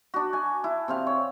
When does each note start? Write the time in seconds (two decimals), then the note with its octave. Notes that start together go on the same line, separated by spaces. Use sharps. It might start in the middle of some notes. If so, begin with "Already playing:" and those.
0.14 D4 F#4
0.33 G#5
0.64 E4
0.88 C3 C4 F5
1.07 C#5